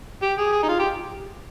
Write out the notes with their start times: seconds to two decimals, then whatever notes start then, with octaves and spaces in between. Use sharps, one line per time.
0.22 G4
0.38 G#4
0.52 G#4
0.63 D#4
0.69 F4
0.79 G4